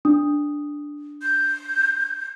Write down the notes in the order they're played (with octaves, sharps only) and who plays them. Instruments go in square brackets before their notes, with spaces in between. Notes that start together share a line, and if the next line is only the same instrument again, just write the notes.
[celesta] D4 D#6
[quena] G6